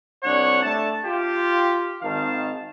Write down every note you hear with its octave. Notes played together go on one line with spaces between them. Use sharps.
C2 D4 C#5 F#5
A3 D4 A5
F4 G4
G#1 D#3 F5 A5